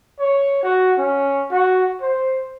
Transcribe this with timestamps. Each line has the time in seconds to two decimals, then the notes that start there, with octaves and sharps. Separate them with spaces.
0.19 C#5
0.63 F#4
0.98 C#4
1.51 F#4
2.01 C5